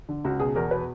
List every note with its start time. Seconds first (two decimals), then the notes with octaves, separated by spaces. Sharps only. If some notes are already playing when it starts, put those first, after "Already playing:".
0.09 D3
0.24 C#2 F#4
0.40 B2 G#4
0.55 E2 A#4
0.71 B2 B4